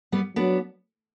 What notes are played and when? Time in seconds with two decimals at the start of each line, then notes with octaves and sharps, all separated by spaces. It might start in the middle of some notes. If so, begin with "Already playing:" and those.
0.12 G3 B3
0.36 F#3 B3 D4